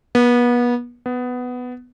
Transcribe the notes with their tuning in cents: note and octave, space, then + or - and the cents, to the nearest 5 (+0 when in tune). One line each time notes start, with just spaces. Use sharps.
B3 -30
B3 +10